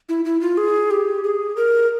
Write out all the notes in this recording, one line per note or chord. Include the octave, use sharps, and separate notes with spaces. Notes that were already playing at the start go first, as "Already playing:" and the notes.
E4
E4
F4
G#4
G4
G#4
A#4